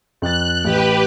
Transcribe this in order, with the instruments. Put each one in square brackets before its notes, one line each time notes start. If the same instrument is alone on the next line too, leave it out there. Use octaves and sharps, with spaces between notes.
[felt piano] F2 A6 [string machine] F#6
[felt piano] A1 [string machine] G4 B4